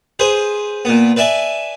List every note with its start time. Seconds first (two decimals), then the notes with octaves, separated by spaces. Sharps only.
0.19 G#4 B4 C5
0.85 A#2 B3
1.16 B4 D5 E5 G#5 A5